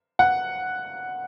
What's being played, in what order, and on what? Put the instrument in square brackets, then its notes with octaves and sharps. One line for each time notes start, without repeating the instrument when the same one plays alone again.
[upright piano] F#5